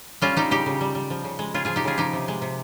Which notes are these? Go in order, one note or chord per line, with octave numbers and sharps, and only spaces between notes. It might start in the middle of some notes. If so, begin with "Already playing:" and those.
G3 C#4 F4
G3 D#4 G4
C#3 D#4 G4
C#3
G3
G3
F3
C#3
G#3
C#3 F4 G#4
F3 F4 G#4
D#4 G4
C#3 F4 G#4
F3 D#4 G4
C3
G#3
C3